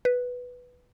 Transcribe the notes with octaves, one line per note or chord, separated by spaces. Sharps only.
B4